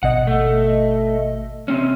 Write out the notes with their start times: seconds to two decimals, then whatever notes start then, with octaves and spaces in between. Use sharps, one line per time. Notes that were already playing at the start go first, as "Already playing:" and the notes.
0.03 G#1 B2 D#5 F#5
0.27 A3
1.68 C3 C4 C#4